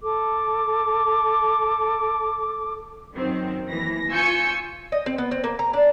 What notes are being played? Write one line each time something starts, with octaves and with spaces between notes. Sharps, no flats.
A4 D6
F#2 D#3 C4
D#2 E3 A#6
F4 G#5 C#6 E6 G6 C#7
D#5
C4
B3
C4
A#3
A#5
D4